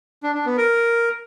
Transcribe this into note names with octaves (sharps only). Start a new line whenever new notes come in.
D4
D4
B3
A#4